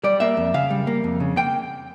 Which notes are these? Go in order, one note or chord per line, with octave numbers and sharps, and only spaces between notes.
G3 D5
A#3 E5
F2
C#3 F5
G3
A#3
F2
C#3
A#3 G5